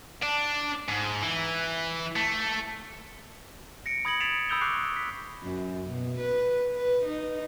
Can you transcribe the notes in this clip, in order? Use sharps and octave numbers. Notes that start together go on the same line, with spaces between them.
D4
G#2
E3
A3
A#6 C#7 D7
B5 D#6 G#6 A#6 C#7 F#7
A6 B6 C7 D7 E7 F7
B5 D#6 E6 G6 F7 G7
C#6 D6 F#6 C7
B6
F#2
B2
B4
B4
D#4